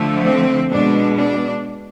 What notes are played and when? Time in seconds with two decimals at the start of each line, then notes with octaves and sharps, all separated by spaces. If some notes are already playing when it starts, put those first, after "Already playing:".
Already playing: D3 F3 A3
0.25 C4
0.71 B2 G#3 D4
1.16 D4